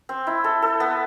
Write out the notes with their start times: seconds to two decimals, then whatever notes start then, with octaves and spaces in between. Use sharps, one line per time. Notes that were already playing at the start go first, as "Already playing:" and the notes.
0.09 C4
0.27 E4
0.44 A4
0.62 A4
0.80 B3